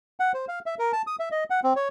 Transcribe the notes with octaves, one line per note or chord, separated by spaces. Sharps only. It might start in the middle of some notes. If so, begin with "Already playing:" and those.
F#5
C5
F5
E5
A#4
A5
D#6
E5
D#5
F#5
C4
C#5